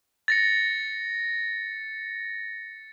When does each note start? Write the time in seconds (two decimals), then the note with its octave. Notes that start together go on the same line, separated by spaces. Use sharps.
0.28 A6 A#6 C#7